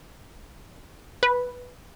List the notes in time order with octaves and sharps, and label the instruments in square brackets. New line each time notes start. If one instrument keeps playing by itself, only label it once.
[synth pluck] B4